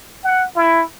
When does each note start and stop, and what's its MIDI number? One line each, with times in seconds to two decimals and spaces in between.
0.24 0.45 78
0.56 0.82 64